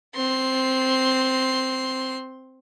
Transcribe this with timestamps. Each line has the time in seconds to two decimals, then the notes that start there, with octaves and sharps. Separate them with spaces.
0.16 C4 C6